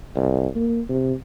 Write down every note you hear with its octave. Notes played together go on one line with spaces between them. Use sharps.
C2
A#3
C3